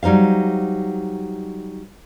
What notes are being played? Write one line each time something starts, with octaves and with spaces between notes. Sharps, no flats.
F#3 G3 D#4 C5 F5